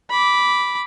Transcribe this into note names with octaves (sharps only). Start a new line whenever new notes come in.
B5 D6